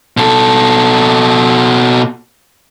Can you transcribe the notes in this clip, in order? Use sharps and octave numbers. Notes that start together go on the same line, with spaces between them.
B2 A4